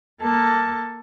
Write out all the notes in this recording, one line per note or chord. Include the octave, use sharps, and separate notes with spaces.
A#3 A4